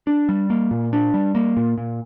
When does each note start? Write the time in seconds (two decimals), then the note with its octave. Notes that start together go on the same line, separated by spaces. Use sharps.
0.07 D4
0.29 G3
0.50 A#3
0.71 A#2
0.93 D4
1.14 G3
1.35 A#3
1.57 A#2
1.78 A#2